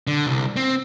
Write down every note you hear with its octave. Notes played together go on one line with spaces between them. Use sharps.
D3
C2
C4